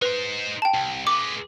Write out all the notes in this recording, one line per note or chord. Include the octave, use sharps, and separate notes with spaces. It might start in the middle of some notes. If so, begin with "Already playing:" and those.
D#4 B4 C5
G5 A5
C2
G#3 B4 D6